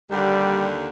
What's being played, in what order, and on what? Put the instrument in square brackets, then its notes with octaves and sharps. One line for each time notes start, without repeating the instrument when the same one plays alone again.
[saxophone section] D#2 D3 [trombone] G3